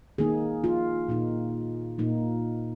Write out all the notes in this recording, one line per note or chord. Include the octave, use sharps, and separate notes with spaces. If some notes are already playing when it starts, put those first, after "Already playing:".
D#3 A#3 D#4 G#4
F4
A#2 A#3 D#4
A#2 A#3 D#4